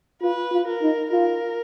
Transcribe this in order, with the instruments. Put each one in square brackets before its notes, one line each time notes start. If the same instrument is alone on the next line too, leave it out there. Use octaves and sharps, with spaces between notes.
[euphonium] F4 [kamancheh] B4
[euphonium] F4
[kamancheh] A#4
[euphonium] D#4
[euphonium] F4 [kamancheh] A#4